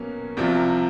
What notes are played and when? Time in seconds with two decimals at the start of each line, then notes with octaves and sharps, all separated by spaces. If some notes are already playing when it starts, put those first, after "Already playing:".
Already playing: B2 F#3 A#3 C#4
0.37 C2 C3 F3